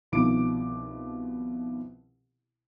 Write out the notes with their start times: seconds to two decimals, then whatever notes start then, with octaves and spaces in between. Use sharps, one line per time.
0.12 C2 B2 D#3 F3 D6 D7